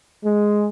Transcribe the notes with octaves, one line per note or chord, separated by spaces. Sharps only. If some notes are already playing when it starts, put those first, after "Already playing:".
G#3